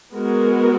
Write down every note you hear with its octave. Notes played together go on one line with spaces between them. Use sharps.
G#3 B3 F#4 A#4